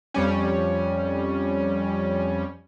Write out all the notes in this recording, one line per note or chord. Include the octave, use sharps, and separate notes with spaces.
F2 G3 C#4